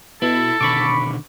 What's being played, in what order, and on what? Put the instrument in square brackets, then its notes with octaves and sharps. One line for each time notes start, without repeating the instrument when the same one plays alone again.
[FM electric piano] B2 [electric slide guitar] E4 [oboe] A4
[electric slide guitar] B2 D3 D#3 [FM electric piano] B5 C#6 D6